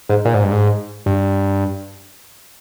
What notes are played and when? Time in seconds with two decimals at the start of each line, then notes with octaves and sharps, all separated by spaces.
0.09 G#2
0.25 A#2
0.34 G#2
0.43 G2
0.52 G#2
1.06 G2